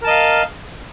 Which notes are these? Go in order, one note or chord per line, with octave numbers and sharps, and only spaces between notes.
A#4 D#5 F5 A5